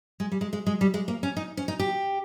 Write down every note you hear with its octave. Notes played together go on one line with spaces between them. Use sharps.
G#3
G3
G#3
G#3
G#3
G3
G#3
A#3
C#4
D#4
C#4
D#4
G4